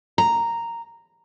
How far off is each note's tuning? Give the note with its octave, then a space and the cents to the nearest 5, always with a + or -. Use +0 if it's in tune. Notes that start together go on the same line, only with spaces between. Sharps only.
A#5 -5